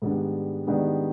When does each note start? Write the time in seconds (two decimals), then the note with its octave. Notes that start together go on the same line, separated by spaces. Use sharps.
0.02 G#2 D#3 G3 B3 D4
0.66 G#2 D#3 G3 B3 D4